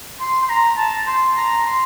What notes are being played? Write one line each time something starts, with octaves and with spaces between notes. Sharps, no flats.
C6
C6
A#5
A5
C6
A#5
C6